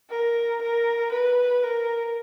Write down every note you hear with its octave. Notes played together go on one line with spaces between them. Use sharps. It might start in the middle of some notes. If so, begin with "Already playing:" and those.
A#4
A#4
B4
A#4